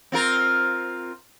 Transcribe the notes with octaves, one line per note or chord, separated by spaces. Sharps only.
C4 F4 A#4